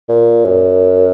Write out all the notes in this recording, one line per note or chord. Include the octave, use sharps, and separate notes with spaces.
A#2
F#2